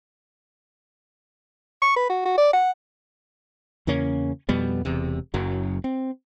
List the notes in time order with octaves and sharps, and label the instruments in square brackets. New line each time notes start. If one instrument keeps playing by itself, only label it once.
[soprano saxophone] C#6
B4
F#4
F#4
D5
F#5
[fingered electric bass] E2 C#3 A#3 C#4
F2 B2 G3 B3
E1 E2 C3
F#1 F#2 F#3
C4